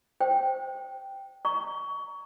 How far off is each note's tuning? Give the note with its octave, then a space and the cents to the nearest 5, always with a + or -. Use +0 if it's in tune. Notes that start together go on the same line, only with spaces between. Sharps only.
C5 +0 G5 +0
A#5 +0 C#6 +25